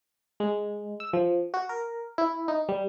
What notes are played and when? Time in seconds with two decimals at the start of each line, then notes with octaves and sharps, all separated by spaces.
0.40 G#3
1.00 E6
1.13 F3
1.54 F#4
1.69 A#4
2.18 E4
2.48 D#4
2.69 G3